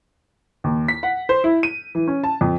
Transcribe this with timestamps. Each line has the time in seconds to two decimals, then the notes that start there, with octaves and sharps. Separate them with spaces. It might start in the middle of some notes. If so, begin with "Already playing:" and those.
0.64 D#2
0.88 B6
1.03 F#5
1.29 C5
1.44 E4
1.63 D#7
1.95 E3
2.08 C#4
2.24 A5
2.41 F2